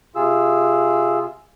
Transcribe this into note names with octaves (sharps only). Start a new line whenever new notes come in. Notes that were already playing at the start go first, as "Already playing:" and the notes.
C3 F4 G#4 E6